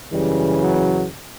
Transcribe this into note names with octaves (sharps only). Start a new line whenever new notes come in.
F#2 C#3 E3 G3
F#3